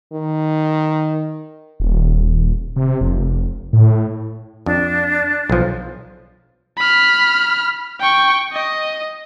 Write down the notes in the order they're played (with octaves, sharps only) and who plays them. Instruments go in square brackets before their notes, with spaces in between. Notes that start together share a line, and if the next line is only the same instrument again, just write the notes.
[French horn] D#3
[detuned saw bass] D#1
C3
F1
A2
[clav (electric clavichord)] F2 [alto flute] D4
[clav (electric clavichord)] B1 F3
[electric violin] B5 F6
G5 C#6
D#5